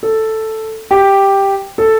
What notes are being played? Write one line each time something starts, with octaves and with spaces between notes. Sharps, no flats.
A4
G4
A4